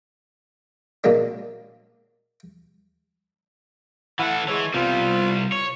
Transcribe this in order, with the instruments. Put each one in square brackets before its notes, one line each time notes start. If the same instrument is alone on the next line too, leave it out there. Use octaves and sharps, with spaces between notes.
[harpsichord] A#2 F#3 G#3 A#3 B3 D4
[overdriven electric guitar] E3 A4 [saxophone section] E4 F5 F#5
[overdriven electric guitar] E3 [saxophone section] G#3 C#5
[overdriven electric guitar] C2 G3 [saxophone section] B3 C4 F4
[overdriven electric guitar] C#5